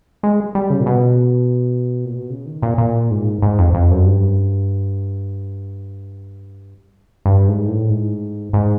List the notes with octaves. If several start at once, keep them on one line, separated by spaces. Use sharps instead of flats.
G#3
G3
C#3
A#2
B2
A#2
B2
C#3
D#3
A#2
A#2
G#2
G#2
F2
F2
F#2
G2
G2
G#2
A2
G#2
G#2